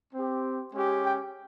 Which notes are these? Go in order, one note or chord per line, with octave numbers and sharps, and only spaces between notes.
C4 G4
G#3 C#4 G4
G5